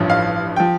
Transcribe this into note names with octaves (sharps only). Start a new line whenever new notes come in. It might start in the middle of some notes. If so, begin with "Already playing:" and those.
Already playing: A1 G2 F3
F5
F3 G5